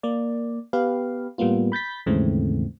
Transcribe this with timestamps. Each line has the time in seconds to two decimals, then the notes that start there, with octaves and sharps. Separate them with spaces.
0.03 A#3 D5
0.73 B3 G4 B4 F5
1.38 A2 G3 A#3 B3 F4
1.72 B5 G6 A6 B6
2.06 D#2 G#2 C#3 E3 A3 C4